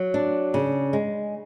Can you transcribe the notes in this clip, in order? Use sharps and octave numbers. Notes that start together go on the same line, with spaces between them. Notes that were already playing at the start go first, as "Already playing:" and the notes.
Already playing: F#3
D4
C#3
G#3